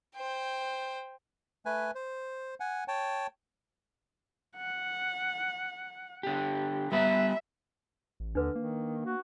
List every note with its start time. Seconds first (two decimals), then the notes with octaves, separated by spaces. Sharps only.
0.16 C5 G5
1.66 A3 B4 G#5
1.95 C5
2.60 F#5 G#5
2.88 C#5 G5 A5
4.57 F#5
6.23 D3 G4
6.92 G3 B3 B4 E5
8.20 A1
8.35 D#2 D3 D4 B4
8.55 D#3 A#3
9.06 F#4